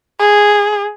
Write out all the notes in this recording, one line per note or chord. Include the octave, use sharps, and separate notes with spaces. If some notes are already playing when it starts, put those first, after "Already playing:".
G#4